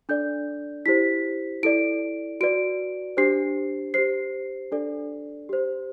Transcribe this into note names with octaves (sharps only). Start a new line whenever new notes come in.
D4 A4 D5 G6
E4 G4 C5 B6
E4 A4 D5 D7
F#4 B4 D5 D7
D4 G4 C5 C7
G4 C5 C7
D4 A4 D5
G4 C5